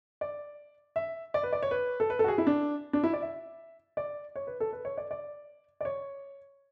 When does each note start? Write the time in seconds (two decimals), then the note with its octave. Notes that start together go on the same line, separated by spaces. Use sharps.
0.21 D5
0.96 E5
1.34 D5
1.43 B4
1.53 D5
1.63 C#5
1.71 B4
2.00 A4
2.10 B4
2.19 A4
2.24 F#4
2.28 G#4
2.38 E4
2.47 D4
2.93 D4
3.04 E4
3.13 D5
3.22 E5
3.97 D5
4.36 C#5
4.47 B4
4.60 A4
4.73 B4
4.85 C#5
4.98 D5
5.11 D5
5.81 D5
5.85 C#5